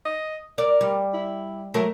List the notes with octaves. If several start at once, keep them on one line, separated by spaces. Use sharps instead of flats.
D#5
A#4 D5
G3
E4
F#3 A3 A#4